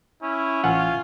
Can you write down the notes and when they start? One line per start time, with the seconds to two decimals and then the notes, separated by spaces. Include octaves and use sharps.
0.23 C#4 E4
0.64 A1 F4 F#5 G#5